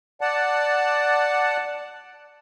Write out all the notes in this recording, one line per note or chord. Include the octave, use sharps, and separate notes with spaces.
D5 F#5 A5